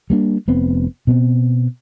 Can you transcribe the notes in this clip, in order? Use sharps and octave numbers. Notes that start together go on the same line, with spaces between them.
G3 A#3 D4
F1 B3 C4
B2 B3 C4